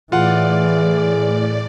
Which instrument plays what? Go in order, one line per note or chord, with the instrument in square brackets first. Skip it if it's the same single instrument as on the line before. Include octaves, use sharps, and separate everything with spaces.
[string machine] A2 D5 [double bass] E3 [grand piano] F4 F#5 [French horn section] G#4